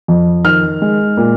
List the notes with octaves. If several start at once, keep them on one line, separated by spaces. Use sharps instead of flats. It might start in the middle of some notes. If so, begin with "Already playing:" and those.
F2
D#3 F6
G#3
A#2